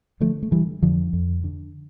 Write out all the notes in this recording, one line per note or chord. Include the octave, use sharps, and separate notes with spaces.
D3 F3 A3
A3
D3 E3 G3
F2 D3 F3
F2
D3